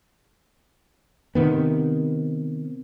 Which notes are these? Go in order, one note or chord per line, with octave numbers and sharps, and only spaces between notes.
C3 D#3 B3